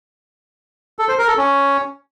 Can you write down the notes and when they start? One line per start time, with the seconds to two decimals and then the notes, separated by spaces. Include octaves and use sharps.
0.99 A4
1.09 C5
1.18 A#4
1.28 A4
1.37 C#4